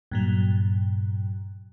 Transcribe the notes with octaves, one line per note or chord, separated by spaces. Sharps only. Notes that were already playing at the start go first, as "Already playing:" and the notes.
G2 A#2 F#3